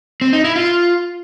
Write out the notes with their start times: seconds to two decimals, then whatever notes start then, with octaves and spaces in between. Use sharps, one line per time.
0.21 C4
0.33 D#4
0.44 E4
0.56 F4